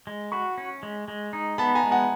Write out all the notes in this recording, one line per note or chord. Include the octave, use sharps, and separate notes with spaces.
G#3
F#4 B5 C#6
C#4
G#3
G#3
D#4
B3 A5 B5
G#5 A#5
G#3
F#5 G#5